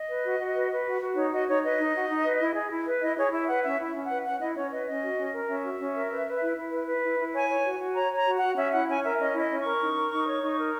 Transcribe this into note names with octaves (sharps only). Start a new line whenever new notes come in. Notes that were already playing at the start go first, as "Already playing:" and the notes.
Already playing: D#5
B4
F#4
F#4
B4
B4
F#4
F#4
D#4 C#5
F#4 D#5
D#4 C#5
B4 D#5
D#4
F#4
D#4
B4
E4
G#4
E4
B4
E4 D#5
G#4 C#5
E4 E5
B4 F#5
C#4 E5
E4 E5
C#4
F#5
B4
C#4 F#5
E4 D#5
C#4 C#5
B4 D#5
C#4 D#5
F#4
C#4
A#4
C#4 E5
F#4
C#4
A#4
B4
B4
E4
E4
B4
B4
E4
E4
C#5 G#5
C#5
F#4
F#4
C#5 A#5
C#5
A#5
F#4
F#4 F#5
C#4 E5
E4 F#5
C#4 G#5
A#4 E5
C#4 D#5
E4
D#5
C#4
C#6
A#4
D#4
A#4
D#4
C#5
D#4
A#4